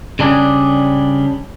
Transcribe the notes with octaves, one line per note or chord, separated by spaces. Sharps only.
C#3 G3 D4 G#4